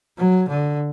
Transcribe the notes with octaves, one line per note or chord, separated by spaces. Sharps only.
F#3
D3